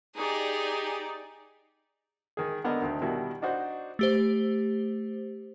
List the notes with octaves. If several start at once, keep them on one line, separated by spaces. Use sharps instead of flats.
D#4 G4 G#4 D5
D#3 G#4
D3 B3 A#4 D#5
D2 D#3
B2 D#3 G3 E4
D4 D#4 F#4 C5
A3 G4 C5